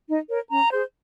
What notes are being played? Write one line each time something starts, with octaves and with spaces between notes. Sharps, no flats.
D#4
A#4 C#5
C#4 A#5
G#4 C5